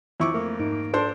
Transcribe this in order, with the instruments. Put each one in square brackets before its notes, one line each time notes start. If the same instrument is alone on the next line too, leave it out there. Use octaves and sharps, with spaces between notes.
[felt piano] F2 C#6 D6 [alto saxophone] E4
[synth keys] A3 [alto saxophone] A#3
[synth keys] G#2 D#4 D7
[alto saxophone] D4 [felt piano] A4 C5 C6